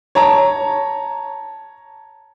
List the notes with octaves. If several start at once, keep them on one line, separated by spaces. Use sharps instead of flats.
C#5 A5 A#5